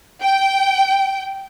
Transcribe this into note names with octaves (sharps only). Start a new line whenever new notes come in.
G5